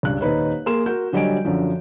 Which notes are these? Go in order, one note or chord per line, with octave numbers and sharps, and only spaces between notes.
C#2 G2 F#6
D#1 D#4 B4 C#5
A#3 G#4 C6 E7
F#4 A#4 G6
D3 F#3 G3 D#5 G#5 D7
F#2 D3 F3